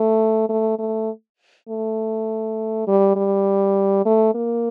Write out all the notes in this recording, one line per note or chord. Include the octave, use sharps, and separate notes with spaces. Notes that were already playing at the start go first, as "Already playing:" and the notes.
Already playing: A3
A3
A3
A3
G3
G3
A3
A#3